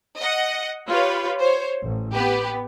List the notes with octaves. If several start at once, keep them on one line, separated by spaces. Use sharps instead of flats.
D#5 F#5
F4 G4 B4 C#5
C5 C#5
A1
B3 G4 B4